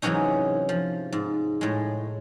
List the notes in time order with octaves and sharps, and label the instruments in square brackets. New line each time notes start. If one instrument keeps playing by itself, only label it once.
[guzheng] G#2 C3 E3 F#3 C#4 D#4
F3
G#2
A2 G#3